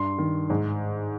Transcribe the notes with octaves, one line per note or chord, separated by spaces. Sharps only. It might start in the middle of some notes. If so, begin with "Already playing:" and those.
Already playing: G2 C6
D#3
G#2